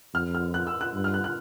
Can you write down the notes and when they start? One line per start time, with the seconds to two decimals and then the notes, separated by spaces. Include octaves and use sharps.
0.14 F2 F6
0.35 F6
0.54 F#6
0.67 E6
0.81 F#6
0.94 G2
1.04 F6
1.14 F#6
1.24 F#6